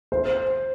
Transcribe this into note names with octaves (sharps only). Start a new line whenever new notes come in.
C5